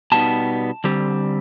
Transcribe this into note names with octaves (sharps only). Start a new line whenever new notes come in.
B2 G3 B3 D#4 A5
D3 G3 C4